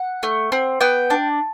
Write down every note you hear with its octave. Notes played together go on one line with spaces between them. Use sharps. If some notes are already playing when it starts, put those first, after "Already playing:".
Already playing: F#5
A3
C4
B3 G5
D4